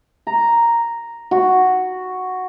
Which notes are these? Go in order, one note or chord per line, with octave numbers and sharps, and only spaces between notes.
A#5
F#4